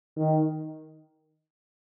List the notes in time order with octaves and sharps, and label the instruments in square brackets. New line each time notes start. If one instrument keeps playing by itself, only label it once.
[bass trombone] D#3